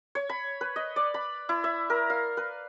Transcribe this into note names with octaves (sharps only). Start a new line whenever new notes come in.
C#5
B5
B4
D#5
D5
B5
E4
E5
A#4
F5
B4